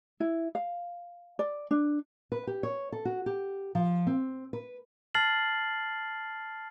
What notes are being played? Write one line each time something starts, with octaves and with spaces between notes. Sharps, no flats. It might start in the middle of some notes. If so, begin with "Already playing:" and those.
E4
F5
D5
D4
B4
G4
C#5
A4
F#4
G4
F3
C4
B4
A5 F6 A6 C7 F#7